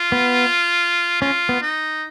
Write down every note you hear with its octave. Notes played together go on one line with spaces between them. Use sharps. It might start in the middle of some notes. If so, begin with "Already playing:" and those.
Already playing: F4
B3
C#4 F4
B3
D#4